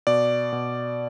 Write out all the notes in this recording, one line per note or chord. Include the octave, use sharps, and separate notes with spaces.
B2 D5
B2